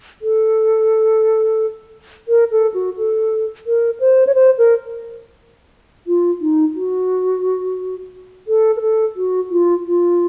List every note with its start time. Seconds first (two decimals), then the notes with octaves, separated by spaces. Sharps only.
0.22 A4
2.28 A#4
2.51 A4
2.74 F#4
2.97 A4
3.66 A#4
4.00 C5
4.27 C#5
4.35 C5
4.58 A#4
6.07 F4
6.41 D#4
6.75 F#4
8.48 A4
8.76 A#4
8.81 A4
9.16 F#4
9.50 F4
9.85 F4